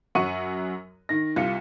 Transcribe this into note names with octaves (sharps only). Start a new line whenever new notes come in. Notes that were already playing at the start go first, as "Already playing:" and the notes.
F#2 F#3 F#4 C#6 D#7
D#3 A#6
C2 F4 C#7